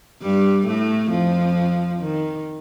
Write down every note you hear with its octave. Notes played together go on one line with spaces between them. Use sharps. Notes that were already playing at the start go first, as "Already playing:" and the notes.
G2 G3
A2 A3
F2 F3
D#3